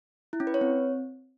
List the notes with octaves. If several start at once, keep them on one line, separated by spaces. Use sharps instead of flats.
E4
C#4
B4
C#5
C4